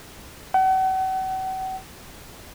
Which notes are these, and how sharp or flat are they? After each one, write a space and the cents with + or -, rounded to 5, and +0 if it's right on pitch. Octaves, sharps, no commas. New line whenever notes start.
F#5 +40